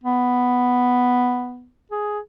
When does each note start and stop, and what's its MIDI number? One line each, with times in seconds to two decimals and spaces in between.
0.03 1.68 59
1.91 2.19 68